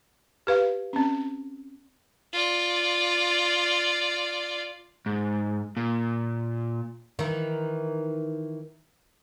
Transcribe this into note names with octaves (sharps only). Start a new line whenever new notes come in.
G4 B4 F5
C4 C#4
F4 D5
G#2
A#2
D#3 E3